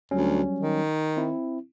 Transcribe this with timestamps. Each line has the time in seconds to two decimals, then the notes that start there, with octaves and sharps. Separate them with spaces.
0.11 D2 F#3 G3 C#4
0.60 D#3
1.17 C4 E4